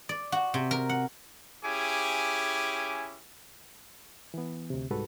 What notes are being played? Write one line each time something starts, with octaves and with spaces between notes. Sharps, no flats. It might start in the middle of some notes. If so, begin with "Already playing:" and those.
D5
F#4
C3
A#4
F#5
C#4 E4 G4 G#4 G#5 D6
E3 B3
D2 C3
C2 G#2 G3 F#4 A4 B4